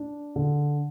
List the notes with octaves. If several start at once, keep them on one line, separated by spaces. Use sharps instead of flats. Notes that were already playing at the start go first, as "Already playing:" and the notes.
Already playing: D4
D3